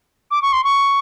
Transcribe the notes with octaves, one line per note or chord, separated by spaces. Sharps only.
D6
C#6
C6
C#6